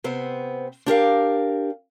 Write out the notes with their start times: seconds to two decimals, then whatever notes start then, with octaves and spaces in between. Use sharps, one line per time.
0.04 C3 B3 C4
0.86 D4 G4 A#4 F5